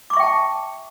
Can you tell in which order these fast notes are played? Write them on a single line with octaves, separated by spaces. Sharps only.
D6 C#6 E5 G5 A5